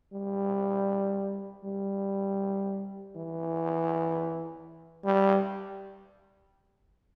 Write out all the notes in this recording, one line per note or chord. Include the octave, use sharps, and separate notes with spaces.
G3
G3
E3
G3